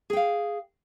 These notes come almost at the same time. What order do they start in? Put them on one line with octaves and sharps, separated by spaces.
G#4 G5 F5